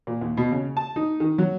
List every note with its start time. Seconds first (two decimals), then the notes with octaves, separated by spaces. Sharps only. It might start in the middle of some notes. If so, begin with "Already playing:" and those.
0.07 A#2
0.21 D#2
0.37 B2
0.52 C#3
0.77 A5
0.96 D#4
1.20 D#3
1.38 F#3